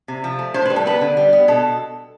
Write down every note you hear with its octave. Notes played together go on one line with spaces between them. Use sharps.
C3
F3
A3
A2 C5
G3 B4
A4
B3 B4
D3
G3
B3
B2 A4